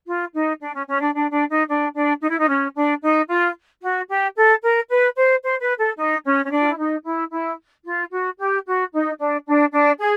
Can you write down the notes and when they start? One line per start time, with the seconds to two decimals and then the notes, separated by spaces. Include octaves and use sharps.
0.06 F4
0.34 D#4
0.61 D4
0.74 C#4
0.87 C#4
1.01 D4
1.14 D4
1.32 D4
1.50 D#4
1.68 D4
1.94 D4
2.21 D#4
2.30 E4
2.39 D#4
2.48 C#4
2.75 D4
3.02 D#4
3.29 F4
3.82 F#4
4.09 G4
4.36 A4
4.62 A#4
4.90 B4
5.16 C5
5.43 C5
5.61 B4
5.79 A4
5.97 D#4
6.24 C#4
6.46 C#4
6.51 D4
6.60 F4
6.69 E4
6.77 D#4
7.04 E4
7.31 E4
7.85 F4
8.11 F#4
8.38 G4
8.66 F#4
8.93 D#4
9.19 D4
9.46 D4
9.72 D4
9.99 G#4